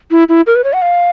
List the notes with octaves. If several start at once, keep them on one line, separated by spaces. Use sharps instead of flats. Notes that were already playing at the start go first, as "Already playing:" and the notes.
E4
E4
A#4
B4
C#5
F#5
F5